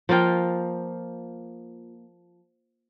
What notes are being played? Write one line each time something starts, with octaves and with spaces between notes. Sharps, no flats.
F3 A#3 F4 G5